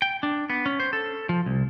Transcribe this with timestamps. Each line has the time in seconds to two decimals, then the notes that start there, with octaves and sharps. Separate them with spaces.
0.02 G5
0.23 D4
0.50 B3
0.66 C#4
0.80 C5
0.93 A4
1.29 F3
1.46 C2